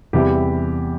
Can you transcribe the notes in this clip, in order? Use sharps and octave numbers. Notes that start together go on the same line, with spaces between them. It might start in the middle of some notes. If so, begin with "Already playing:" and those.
E2 C3 E3 G3 G4